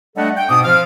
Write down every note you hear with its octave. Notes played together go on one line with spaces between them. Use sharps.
G3 A3 D4 A4 D#5 F#5
G5
G#2 B2 C4 D6 D#6
F3 F5 F6